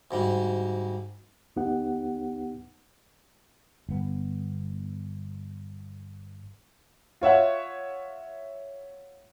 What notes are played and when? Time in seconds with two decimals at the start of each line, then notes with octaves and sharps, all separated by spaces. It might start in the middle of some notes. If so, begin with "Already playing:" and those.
0.11 D2 G#2 G3
1.56 D2 B3 D#4 G4 F#5
3.89 G1 B3
7.21 F4 C#5 E5 F#5